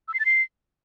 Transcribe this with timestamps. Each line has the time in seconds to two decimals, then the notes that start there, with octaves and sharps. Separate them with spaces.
0.08 E6
0.14 C7
0.20 A6
0.26 C7